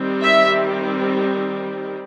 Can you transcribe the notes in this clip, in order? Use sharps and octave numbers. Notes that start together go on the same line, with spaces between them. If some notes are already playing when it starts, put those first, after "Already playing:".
Already playing: D#3 G3 C4
E5